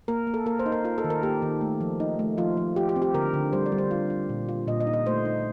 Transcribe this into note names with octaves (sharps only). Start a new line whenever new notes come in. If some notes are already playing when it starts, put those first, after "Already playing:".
A#3 A#4
A#3
A4
A#3 A#4
C5
D#4
A#4
F4 A#4
A4
D#3
A#4
A#3 G4
D#3
A3
F3
D#4
A3
F3 F4
F3
F4 G4
G4
C4
G4
D3 A#4
D3
G3 C5
D5
G3
C5
F4
F4
A#2
F4
A#2 D#5
D#5
D#4
D#5
A3 C5
D#4